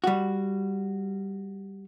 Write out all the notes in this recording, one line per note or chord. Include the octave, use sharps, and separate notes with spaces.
G3 F#4